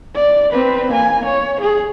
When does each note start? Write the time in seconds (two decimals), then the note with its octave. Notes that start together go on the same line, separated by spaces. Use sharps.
0.15 D5
0.53 C4 B4
0.91 A#3 G#5
1.25 C#5
1.61 G#4